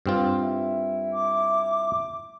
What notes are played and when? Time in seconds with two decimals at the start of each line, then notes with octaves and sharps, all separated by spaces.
0.06 G2 C4 F4
0.43 E4
1.13 D6